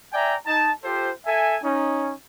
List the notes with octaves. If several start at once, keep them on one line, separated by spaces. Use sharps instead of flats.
D5 E5 G5 G#5 A#5
D#4 A5
F4 G4 A4 C5
A4 E5 G#5
C#4 D#4